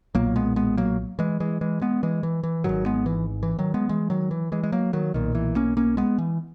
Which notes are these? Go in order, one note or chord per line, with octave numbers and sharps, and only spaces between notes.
B1 A#2 F#3 A#3
G#3 B3
G#3 B3
F#3 A#3
E3 G#3
E3 G#3
E3 G#3
G#3 B3
E3 G#3
E3
E3
G#1 G#2 D#3 F#3
G#3 B3
E3
E3
D#3 F#3
G#3 B3
E3 G#3
D#3 F#3
E3
E3 G#3
G#3
F#3 A#3
D#3 F#3
B1 A#2 D#3
E3
A#3 C#4
A#3 C#4
G#3 B3
E3